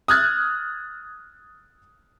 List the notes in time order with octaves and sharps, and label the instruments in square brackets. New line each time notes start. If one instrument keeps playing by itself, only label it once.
[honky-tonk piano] D#6 F6 F#6 G#6 A6